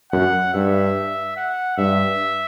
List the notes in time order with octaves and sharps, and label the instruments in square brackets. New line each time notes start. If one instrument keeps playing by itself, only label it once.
[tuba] F#2 [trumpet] F#5
[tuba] G2 [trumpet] E5
[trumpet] F#5
[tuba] G2 [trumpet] E5